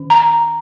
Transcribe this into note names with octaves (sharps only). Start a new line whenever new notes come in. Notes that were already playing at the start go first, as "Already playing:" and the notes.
Already playing: D#3 C#4
A#5